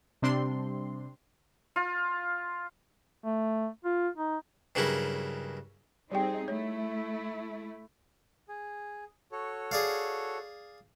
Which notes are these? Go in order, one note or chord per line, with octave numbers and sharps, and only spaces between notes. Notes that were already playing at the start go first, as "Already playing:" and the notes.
C3 G3 C4 D4 C6
F4
A3
F4
D#4
G2 C#3 F#3 A#3 E4
G3 C4 D#4 G4 G#4 G5
A3 E4 C#5
G#4
F#4 A4 C#5
G#4 D5 F5